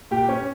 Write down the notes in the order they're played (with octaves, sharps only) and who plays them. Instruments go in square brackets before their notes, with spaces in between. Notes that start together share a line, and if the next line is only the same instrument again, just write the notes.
[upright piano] A#2 G4
C#4